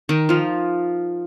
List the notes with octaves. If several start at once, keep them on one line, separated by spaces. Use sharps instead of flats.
D#3 D#4
F3 F4